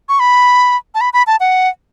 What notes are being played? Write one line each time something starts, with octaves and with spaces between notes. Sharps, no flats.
C#6
B5
A5
B5
B5
A5
F#5